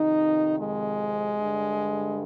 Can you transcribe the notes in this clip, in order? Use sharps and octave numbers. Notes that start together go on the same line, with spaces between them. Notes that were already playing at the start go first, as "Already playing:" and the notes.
Already playing: F2 C3 D#3 D#4
G#3
G2 D3